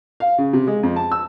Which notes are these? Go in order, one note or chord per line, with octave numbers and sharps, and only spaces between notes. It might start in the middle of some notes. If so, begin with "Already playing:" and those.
F5
C#3
C3
G#3
F2
A5
E6